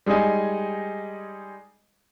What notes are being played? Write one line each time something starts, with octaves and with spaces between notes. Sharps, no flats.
G3 G#3 D#4 D#5 G#5